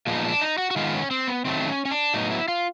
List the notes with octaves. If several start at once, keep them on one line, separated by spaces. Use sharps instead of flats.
A#2 F3 G#3 B3
D#4
D4
D#4
F#4
F#4
D#3 G#3 B3 F4
C#4
C4
B3
D#3 F#3 A3 C4
C4
C#4
C#4
D4
A2 F#3 B3 D#4
E4
F4